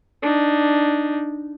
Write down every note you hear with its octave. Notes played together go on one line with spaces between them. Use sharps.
D4 D#4